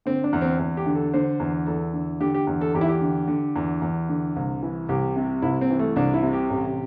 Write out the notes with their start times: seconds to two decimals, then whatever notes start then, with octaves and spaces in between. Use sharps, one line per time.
0.06 D3 C4
0.24 D4
0.33 E2
0.41 C4
0.59 E2
0.77 G4
0.86 D3
0.95 A4
1.14 D3 C5
1.40 E2
1.67 E2 A4
1.93 D3
2.20 D3 G4
2.34 G4
2.47 E2
2.61 A4
2.74 E2 G4
2.81 E4
2.88 G4
3.01 D3
3.28 D3
3.56 E2
3.82 E2
4.09 D3
4.36 C2
4.63 E3
4.89 C2 G4
5.16 C3
5.42 C2 E4
5.61 C4
5.70 E3
5.79 A3
5.96 C2 D4
6.14 E4
6.23 C3
6.33 G4
6.50 A1